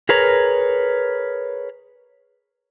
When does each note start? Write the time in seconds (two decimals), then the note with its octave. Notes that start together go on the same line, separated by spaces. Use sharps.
0.09 G#4 A#4 B4 C#5 A#5